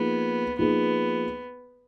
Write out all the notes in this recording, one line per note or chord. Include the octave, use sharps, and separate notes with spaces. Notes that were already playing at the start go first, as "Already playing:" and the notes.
Already playing: F3 A#3 B3 D#4 G#4
F3 A#3 B3 D#4 G#4